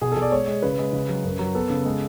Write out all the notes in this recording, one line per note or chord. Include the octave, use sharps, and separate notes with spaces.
B2 G#4
B2 A4
D5
G#3 C#5
G#3
C#3 B4
G#3
C#3
F#3
F#2
F#3
B3 A4
C#3
G#3